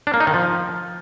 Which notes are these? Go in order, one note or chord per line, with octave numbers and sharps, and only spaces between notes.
D4
A#3
D#4
D#3
F3